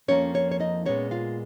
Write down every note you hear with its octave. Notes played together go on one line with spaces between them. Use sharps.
F2 F3 A#3 C#4 C#5
C#4 C#5
C#5
D#4 D#5
A#2 G#3 B3 C#4 C#5
F4 F5